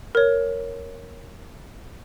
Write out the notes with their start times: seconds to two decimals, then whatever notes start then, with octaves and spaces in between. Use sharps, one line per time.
0.15 A#4 C#5